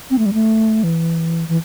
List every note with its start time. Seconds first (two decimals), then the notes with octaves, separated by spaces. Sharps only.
0.11 C4
0.19 A3
0.26 G3
0.33 A3
0.84 E3
1.49 E3